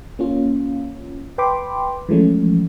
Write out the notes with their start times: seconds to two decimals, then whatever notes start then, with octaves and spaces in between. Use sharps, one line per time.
0.19 A#3 C#4 F4
1.38 B4 G5 B5 C6 D6
2.09 E3 F3 G#3 A3 C#4